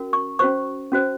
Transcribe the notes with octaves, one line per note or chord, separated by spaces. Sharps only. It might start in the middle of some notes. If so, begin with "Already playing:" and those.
Already playing: C#4 F#4 A#4
C#6
C#4 F#4 C5 C#6
C#4 F#4 C5